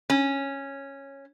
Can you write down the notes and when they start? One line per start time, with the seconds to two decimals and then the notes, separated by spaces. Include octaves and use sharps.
0.10 C#4